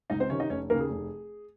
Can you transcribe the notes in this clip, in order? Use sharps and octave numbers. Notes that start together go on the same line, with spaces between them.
C#2 D#4 D#5
C4 C5
C3 D#3 C#4 C#5
D#4 D#5
F1 C#4 C#5
D#2 C#3 A#3 A#4
G#4
F1